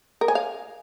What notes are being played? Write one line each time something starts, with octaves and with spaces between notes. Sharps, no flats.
A#4
G#5
F5